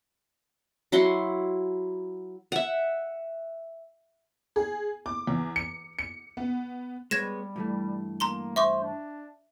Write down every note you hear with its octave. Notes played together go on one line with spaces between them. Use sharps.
F#3 E4 F#5 C6
E5 F#5
G#4
D6
E2
C#7
C#7
B3
G3 G#3 B3 C#5 G#6 A#6 E7
G2 E3 A3
A#3 A#5 C6 G7
C5 E5 C#6 D6
D4